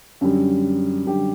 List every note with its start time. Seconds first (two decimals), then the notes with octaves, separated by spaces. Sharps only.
0.21 F#2 D3 G3
1.06 F#2 D3 G3 G4